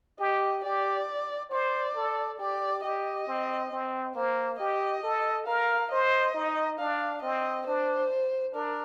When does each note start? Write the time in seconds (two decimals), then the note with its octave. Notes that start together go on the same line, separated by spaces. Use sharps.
0.20 G4 D#5
0.64 G4 D5
1.51 C5 D5
1.95 A4
2.39 G4 D5
2.83 G4 D#5
3.27 C4
3.71 C4
4.15 A#3 C5
4.59 G4 D#5
5.03 A4
5.47 A#4 F5
5.91 C5 D#5
6.34 D#4
6.79 D4 F5
7.22 C4 D#5
7.66 D4 C5
8.54 D4 A#4